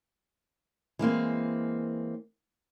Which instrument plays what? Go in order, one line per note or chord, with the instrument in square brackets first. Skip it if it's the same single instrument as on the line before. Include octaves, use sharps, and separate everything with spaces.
[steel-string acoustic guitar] E3 G#3 A#3 C4